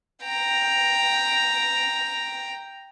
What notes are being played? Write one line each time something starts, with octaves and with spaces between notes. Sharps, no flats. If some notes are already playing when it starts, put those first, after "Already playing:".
G5 A#5